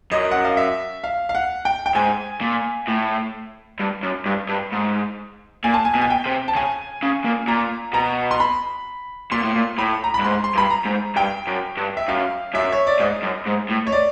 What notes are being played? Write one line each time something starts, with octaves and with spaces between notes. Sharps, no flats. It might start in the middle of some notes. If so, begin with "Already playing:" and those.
F#2 D#5
F#5
F5
E5
F5
F5
F#5
G5
G5
G#2 G#5
A#2
A2
G2
F#2
G2
G2
G#2
A#2 G#5
A5
G#5
B2
G#5
G5
C3
A5
C#3 G#5
C#3
A#2
A#2 A#5
B2 A#5
C6
B5
A#2 C6
A2
A#2
A2 B5
A#5
B5
G2
G#2 C6
C6
G2 B5
A#5
G#2
G2 G5
F#2
G2
E5
F#2 F5
F#2 E5
C#5
D5
G#2 D#5
F#2
G#2
A2
C#5
D5